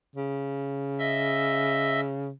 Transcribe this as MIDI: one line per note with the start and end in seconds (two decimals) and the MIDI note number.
0.16 2.31 49
0.99 2.00 75
0.99 2.00 76
0.99 2.00 88